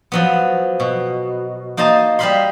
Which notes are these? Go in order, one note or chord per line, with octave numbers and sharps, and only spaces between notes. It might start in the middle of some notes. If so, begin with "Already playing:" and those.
F3 F#3 B3
B2
A#3 D#4 C5 D#5 A5
G3 C5 D#5 F5 B5 C6